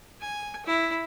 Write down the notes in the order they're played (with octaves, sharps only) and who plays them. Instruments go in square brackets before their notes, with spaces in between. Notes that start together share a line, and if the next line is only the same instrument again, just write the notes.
[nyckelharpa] G#5
E4